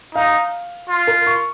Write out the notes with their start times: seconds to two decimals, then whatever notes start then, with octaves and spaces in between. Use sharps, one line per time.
0.15 D#4 F5
0.89 F4
1.07 A#4
1.26 C#6